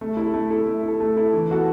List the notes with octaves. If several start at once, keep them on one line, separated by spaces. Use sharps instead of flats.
A3
E4 A4
A3
E4 A4
A3
E4
A4
A3
E4 A4
E3
B3 F#4 A4